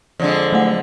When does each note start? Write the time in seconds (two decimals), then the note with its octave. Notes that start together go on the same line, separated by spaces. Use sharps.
0.20 F2 D3 G#3
0.52 F#3 A3 F#5